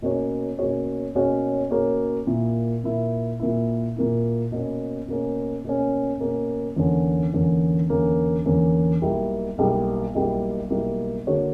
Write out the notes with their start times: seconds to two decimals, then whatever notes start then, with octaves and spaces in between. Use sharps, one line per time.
0.02 B2 A#3 C#4 F#4 C#5
0.59 B2 A#3 C#4 F#4 C#5
1.15 B2 A#3 C#4 F#4 C#5
1.71 B2 A#3 C#4 F#4 C#5
2.27 A#2 A#3 E4
2.84 A#2 A#3 E4
3.40 A#2 A#3 E4
3.96 A#2 A#3 E4
4.52 B2 A#3 C#4
5.08 B2 A#3 C#4
5.64 B2 A#3 C#4
6.20 B2 A#3 C#4
6.76 E2 D3 A#3 C#4
7.33 E2 D3 A#3 C#4
7.90 E2 D3 A#3 C#4
8.45 E2 D3 A#3 C#4
9.02 B1 B2 G3 A#3 E4
9.58 B1 B2 G3 A#3 E4
10.15 B1 B2 G3 A#3 E4
10.70 B1 B2 G3 A#3 E4
11.27 D3 A#3 D4 F#4 C#5